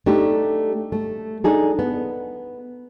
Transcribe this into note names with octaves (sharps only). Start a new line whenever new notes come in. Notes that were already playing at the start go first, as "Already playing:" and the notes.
A3 D4 D#4 G4
A3
D4 D#4 G#4 A4
B3